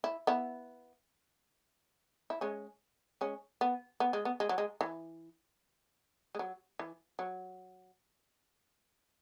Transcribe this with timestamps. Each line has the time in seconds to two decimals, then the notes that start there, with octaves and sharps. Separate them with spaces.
0.04 E4
0.27 B3 E4
2.30 E4
2.41 G#3 C#4
3.21 G#3 C#4
3.61 B3
4.00 B3
4.13 G#3
4.25 B3
4.40 G#3
4.49 F#3
4.58 G#3
4.81 E3
6.35 G#3
6.39 F#3
6.79 E3
7.19 F#3